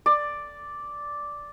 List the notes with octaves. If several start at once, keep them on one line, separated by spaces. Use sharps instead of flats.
D5